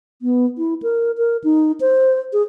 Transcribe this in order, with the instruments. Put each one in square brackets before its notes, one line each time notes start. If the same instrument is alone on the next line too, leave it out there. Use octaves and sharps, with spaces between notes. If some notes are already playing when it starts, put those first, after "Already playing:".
[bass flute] B3
E4
A#4
A#4
D#4
C5
G#4